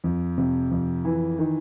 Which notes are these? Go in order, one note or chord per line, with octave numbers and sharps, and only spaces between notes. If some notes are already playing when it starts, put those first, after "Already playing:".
F2
C3
F2
E3
D#3